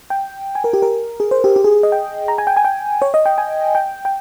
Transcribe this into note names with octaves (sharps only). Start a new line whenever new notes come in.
G5
G#5
A#4
G4
A#4
G#4
C5
G4
G4
G#4
D#5
G5
A#5
G#5
G5
G#5
G5
C#5
D#5
G5
G#5
G5
G5